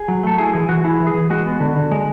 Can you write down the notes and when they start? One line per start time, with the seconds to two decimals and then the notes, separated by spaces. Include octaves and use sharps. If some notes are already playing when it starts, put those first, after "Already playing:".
Already playing: G#4
0.08 F#3
0.23 A3 A4
0.38 E4 G#4
0.54 E3 G#4
0.69 E3 F#4
0.84 E4 G#4
1.00 E3
1.07 G#4
1.14 E3
1.30 G#3 F#4
1.46 B3
1.60 D3
1.76 D3
1.91 G#3